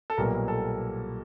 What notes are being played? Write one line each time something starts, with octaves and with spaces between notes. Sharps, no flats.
A4
B1 A#2 G3 B3 A#4
A4